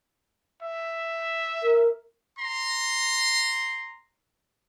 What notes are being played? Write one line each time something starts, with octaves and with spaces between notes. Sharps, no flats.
E5
A#4
A#5 C6